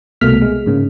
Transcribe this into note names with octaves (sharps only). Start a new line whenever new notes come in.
C2 B2 A3 A#3 F6 B6
G#3
G#2 C#3 A#3